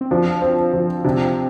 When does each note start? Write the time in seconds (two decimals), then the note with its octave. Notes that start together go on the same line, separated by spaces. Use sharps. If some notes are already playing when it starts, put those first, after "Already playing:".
0.01 C4
0.11 F3 D4
0.42 C4
0.73 F3
1.04 C3 D4